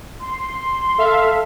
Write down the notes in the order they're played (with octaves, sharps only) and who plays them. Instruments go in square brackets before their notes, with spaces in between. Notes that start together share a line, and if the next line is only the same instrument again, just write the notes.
[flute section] C6
[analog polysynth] A4 E5 F5